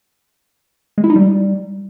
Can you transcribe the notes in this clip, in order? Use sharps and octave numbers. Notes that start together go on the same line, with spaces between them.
G#3
E4
D#4
G3